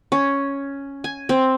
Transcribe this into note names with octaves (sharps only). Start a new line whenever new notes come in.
C#4
G#5
C4